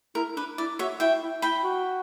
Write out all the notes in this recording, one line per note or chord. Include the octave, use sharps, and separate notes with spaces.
E4 A#4
D4 B4
E4 D5
F#4 C#5 E5
E4 E5 G5
E4
E4 G5 B5
F#4